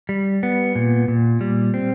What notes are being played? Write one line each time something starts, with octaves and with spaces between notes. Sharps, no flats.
G3
B3
A#2
A#2
G3
C4